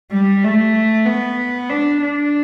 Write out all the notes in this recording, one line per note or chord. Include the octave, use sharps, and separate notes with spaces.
G3
A3
B3
D4
D4